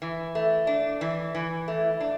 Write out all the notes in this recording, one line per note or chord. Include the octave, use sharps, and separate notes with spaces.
E3
A3
D4
E3
E3
A3
D4